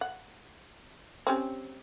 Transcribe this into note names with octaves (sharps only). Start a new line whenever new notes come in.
F#5
C4 C#4 G4